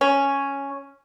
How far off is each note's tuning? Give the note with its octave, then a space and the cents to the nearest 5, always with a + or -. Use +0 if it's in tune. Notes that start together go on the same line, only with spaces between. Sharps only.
C#4 +0